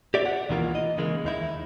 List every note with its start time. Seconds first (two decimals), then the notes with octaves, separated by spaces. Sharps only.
0.14 G4 D5 E5
0.26 F#5
0.49 C#2 B2 D#3 E3 A#3 F4
0.75 D#5
0.98 C#3 E3 G#3 A#3
1.24 D#2 D#4 E4